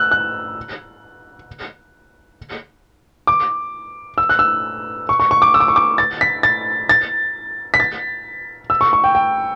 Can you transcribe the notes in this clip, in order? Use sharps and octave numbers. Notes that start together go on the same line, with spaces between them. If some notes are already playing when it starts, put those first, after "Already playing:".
Already playing: E6 F#6
F#6
D6
E6
F#6
E6
C#6
C#6
C#6
D6
E6
D6
C#6
D6
A6
B6
A6
A6
B6
A6
E6
C#6
C#6
G5
G5